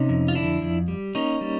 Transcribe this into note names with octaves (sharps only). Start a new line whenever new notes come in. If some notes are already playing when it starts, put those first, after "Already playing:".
Already playing: C3 C#4 D#4
F2
F4
D3 D4 E4
F2
G3
A#3 C#4 D#4
G3